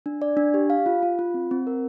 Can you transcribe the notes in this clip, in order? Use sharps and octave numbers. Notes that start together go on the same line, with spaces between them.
D4
D5
D4
G4
F5
F4
F4
F4
C4
C4
A#4